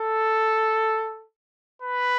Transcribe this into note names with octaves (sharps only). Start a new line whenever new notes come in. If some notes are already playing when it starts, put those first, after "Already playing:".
Already playing: A4
B4